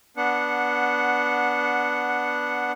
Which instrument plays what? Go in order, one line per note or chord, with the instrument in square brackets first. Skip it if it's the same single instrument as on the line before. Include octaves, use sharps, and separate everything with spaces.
[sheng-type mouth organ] B3 D4 F#5